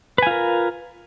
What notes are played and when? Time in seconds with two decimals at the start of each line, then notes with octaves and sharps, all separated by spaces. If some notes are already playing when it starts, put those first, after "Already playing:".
0.18 B4
0.23 G#5
0.27 F4
0.31 A#4